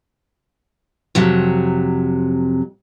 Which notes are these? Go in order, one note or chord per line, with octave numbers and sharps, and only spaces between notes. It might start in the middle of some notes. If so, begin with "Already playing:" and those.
F2 C3 F#3